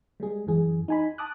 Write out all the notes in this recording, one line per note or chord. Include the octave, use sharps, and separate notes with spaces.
G3 G#3 G#4
F#2 E3 G#4
D#4 G#5 B5
A5 D6 D#6 F#6